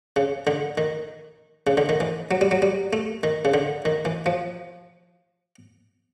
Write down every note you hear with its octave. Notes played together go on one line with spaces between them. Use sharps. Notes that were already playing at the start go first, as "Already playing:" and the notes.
C#3
D3
D#3
C#3
D3
D#3
E3
F#3
G3
F#3
G3
A3
D#3
C#3
D3
D#3
E3
F3